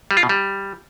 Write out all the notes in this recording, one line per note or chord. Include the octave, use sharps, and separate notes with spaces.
G3
F4
B2
G3